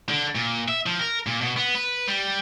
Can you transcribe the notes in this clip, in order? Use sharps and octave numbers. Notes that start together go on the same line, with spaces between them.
D3
A#2
E5
F3
A#4
A#2
B2
B3
B4
G3